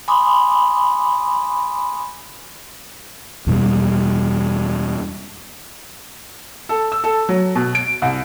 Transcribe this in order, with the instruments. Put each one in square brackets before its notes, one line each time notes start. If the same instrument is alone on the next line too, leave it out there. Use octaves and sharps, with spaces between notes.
[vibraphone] G#5 B5 C6 D6 D#6
[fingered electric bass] E2 B2 G3
[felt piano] A4
E6
A4
F#3
B2
D7
C2